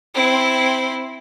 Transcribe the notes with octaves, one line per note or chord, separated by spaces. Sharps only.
C4 E4